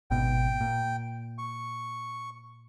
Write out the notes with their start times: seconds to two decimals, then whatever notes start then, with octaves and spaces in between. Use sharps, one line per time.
0.11 G#1 B2 G5
0.61 A#2
1.38 C#6